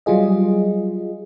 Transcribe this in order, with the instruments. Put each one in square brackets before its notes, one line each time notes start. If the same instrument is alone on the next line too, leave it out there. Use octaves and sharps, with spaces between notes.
[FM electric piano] F#3 G3 F4 G#4 D#5